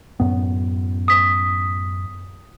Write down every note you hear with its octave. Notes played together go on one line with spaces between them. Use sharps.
F#2 A2 B3
D#6 B6